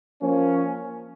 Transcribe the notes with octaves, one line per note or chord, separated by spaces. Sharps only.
F3 A#3 C#4